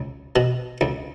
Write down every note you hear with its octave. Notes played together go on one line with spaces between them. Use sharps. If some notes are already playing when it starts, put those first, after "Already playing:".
Already playing: C#2
B2
C#2